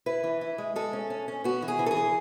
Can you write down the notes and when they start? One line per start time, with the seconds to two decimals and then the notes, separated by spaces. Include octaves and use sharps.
0.06 E4 B4
0.24 E3
0.41 E4
0.58 G#3
0.76 G#3 A4
0.93 C#4
1.10 C#4
1.28 C#4
1.44 B3 F#4
1.62 E3
1.68 G#4
1.79 E3
1.86 A4
1.91 G#4
1.96 E3